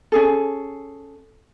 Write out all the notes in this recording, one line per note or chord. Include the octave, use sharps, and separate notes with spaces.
C#4 G#4 A4